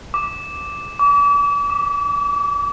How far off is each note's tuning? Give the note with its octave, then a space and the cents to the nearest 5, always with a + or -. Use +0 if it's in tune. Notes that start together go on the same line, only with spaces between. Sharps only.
D6 -5
D6 -40
D6 +0